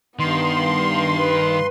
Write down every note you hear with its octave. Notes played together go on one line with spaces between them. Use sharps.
G2 D#3 B3 C6
B4